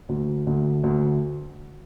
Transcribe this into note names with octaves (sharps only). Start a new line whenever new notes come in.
D2
D2
D2